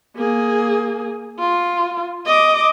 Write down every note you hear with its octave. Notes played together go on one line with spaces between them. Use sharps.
A#3 G#4
F4
D#5 D6